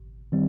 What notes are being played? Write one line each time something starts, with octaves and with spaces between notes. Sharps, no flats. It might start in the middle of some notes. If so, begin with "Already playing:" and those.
Already playing: G#1
D#3 G3 C4